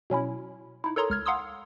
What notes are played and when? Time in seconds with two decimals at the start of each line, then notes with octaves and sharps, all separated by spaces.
0.10 B2 F#3 C#4 E4
0.84 D#4 E4
0.96 A4 A#4 C#5 A#5 C6 D#6
1.10 C#2 F6 G#6
1.26 F5 F#5 A#5 C6 D#6 E6